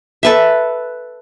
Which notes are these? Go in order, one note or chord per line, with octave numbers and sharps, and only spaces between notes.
A4 B4 E5